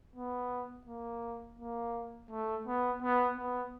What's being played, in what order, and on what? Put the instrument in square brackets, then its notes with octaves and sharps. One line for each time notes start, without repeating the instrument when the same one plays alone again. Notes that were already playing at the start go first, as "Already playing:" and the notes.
[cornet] B3
A#3
A#3
A3
B3
B3
B3